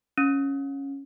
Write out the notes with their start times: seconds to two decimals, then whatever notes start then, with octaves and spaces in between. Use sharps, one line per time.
0.18 C#4